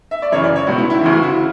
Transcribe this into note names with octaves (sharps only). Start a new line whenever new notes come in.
E5
D5
F#2 C#3 E3 C#5
D5
C#5
C#2 B2 F#4
E4
E4
D2 C#3 E3 E4
F#4
E4
C#3